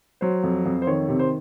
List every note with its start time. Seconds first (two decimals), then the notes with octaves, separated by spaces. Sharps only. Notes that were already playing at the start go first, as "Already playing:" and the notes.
0.21 F#3 C5
0.43 F2
0.65 F2
0.82 C5
0.87 D#3 C#5
1.08 C3
1.19 C5